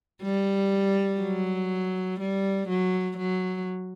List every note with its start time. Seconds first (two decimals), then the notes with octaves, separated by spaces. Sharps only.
0.23 G3
1.21 F#3
2.20 G3
2.69 F#3
3.17 F#3